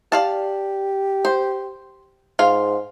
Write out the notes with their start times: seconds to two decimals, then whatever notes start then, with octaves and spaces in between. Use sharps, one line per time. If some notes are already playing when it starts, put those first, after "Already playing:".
0.12 G4 D5 F5 A5
1.25 C5
2.39 G#2 F4 F5